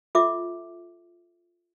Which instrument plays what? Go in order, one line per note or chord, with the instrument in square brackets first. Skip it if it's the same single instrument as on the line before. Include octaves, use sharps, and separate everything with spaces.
[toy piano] F4 A4 E5 D6